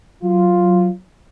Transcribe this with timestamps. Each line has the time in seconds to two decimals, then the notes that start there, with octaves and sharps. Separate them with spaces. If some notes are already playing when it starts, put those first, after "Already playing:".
0.22 F#3 F4